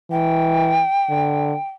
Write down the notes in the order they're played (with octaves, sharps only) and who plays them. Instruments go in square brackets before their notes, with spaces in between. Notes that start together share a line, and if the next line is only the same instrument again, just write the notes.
[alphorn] E3 [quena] G5
[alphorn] D3